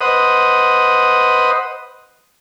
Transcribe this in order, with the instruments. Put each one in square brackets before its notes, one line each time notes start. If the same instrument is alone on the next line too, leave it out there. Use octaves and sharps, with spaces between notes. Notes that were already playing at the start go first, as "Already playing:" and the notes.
[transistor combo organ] B4 C5 D#5 F#5 D#6